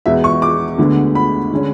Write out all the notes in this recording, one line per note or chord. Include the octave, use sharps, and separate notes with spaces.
E2 B2 G#3 B3 E5
C#6
D6
D2 D3 G#3 B3
B5
D3 G#3 C#4